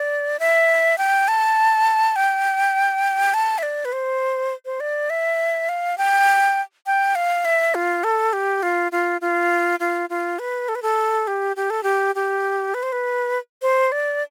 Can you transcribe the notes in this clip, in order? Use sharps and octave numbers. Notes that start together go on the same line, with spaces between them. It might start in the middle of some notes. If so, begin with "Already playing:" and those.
Already playing: D5
E5
G5
A5
G5
A5
E5
D5
B4
C5
C5
D5
E5
F5
G5
G5
F5
E5
F4
A4
G4
F4
F4
F4
F4
F4
B4
A4
B4
A4
G4
G4
A4
G4
G4
B4
C5
B4
C5
D5